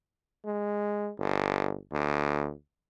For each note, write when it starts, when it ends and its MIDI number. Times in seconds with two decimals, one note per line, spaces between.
0.45 1.10 56
1.18 1.77 31
1.92 2.52 38